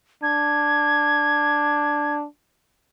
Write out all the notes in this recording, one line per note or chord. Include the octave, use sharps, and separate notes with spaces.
D4 G#6